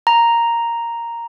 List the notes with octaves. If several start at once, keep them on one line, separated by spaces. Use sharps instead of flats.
A#5